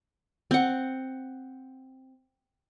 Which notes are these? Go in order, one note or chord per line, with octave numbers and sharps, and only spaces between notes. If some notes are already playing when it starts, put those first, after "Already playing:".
C4 F#5